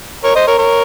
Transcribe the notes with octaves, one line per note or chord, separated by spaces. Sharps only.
A#4 C#5
C5 D#5
A#4 C#5
A#4 C#5